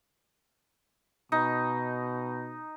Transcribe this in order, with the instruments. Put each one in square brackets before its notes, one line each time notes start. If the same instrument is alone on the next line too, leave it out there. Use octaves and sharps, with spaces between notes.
[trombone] B2 [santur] D#4